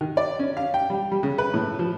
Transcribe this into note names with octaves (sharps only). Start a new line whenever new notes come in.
D#3
D5
C#4
F5
G5
G3
G3
C#3
B4
A2
F3